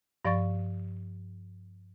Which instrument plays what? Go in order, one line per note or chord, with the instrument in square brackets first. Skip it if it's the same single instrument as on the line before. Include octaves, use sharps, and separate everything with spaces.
[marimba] G2 F3 D5 F5 C#6 A6